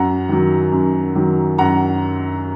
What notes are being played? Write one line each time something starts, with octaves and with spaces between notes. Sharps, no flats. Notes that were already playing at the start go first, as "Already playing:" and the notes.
Already playing: F#2 F#5 A#5
D#3 F#3
F#2
D#3 F#3
F#2 F#5 A#5